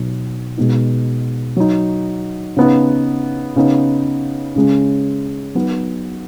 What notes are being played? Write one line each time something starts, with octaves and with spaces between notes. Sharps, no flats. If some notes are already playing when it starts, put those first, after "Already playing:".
Already playing: B2 F#3 B3 D#4
B2 G#3 B3 D#4
F#3 D#4
C#3 B3 D#4
C#3 B3 D#4
C#3 G#3 C#4
F#3 B3 D#4